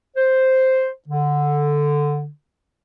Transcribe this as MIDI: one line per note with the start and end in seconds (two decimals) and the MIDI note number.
0.17 0.89 72
1.09 2.28 50